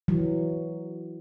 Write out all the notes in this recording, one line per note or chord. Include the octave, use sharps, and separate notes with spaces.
E3 F#3